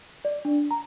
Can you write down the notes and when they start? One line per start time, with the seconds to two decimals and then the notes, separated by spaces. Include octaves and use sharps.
0.25 D5
0.45 D4
0.71 A#5